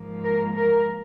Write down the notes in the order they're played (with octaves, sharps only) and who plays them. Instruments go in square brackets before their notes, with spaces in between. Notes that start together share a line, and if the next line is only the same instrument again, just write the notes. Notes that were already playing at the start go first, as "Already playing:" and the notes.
Already playing: [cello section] G#2 F3 A#3
A#4
A#4